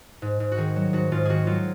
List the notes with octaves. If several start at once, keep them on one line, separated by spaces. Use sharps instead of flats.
G#2
G#2
F#4
D#3 G#4
F#3
G#2 F#4
G#2 F4
D#3 F#4 G#4
F#3 F4